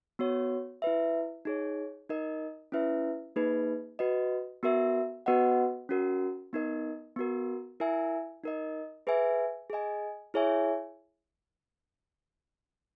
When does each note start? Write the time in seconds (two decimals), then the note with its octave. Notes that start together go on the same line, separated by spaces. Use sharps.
0.19 B3 F#4 C#5
0.82 E4 B4 E5
1.45 D#4 G#4 C#5
2.09 D#4 A#4 D#5
2.72 C#4 E4 B4 E5
3.36 A#3 D#4 G#4 B4
3.99 F#4 B4 D#5
4.63 B3 F#4 A#4 E5
5.26 B3 F#4 B4 D#5 F#5
5.89 C#4 F#4 A#4
6.53 B3 D#4 A#4 D#5
7.16 B3 F#4 A#4
7.80 E4 A#4 E5 G#5
8.44 D#4 A#4 D#5
9.07 G#4 B4 E5 G#5
9.70 G#4 D#5 G#5
10.34 E4 G#4 C#5 E5 G#5